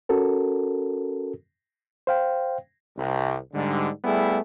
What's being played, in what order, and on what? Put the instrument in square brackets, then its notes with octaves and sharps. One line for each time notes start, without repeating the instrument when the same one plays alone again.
[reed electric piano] C#4 F#4 A4 A#4
C5 F5 G5
[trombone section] C2
G#2 D3 G3
G3 A3 B3 E4 G4 G#4